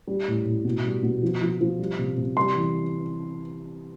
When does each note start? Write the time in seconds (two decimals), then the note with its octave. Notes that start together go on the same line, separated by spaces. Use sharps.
0.07 G3
0.28 A2
0.46 A2
0.65 B2
0.84 G3
1.03 B2
1.23 F3
1.42 F3
1.61 F3
1.79 G3
1.98 C3
2.17 C3
2.37 G3 C6
2.56 E3